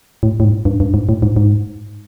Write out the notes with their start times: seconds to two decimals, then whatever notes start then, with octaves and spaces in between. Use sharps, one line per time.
0.23 A2
0.40 A2
0.44 G#2
0.65 G2
0.80 G2
0.94 G#2
1.09 A2
1.22 G#2
1.36 G#2